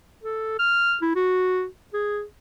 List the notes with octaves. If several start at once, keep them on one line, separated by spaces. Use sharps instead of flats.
A4
F6
E4
F#4
G#4